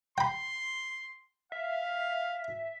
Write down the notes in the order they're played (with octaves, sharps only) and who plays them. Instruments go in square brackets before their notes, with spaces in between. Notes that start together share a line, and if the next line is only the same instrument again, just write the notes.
[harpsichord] G5 B5 [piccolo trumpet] C6
[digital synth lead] E5 [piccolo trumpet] F5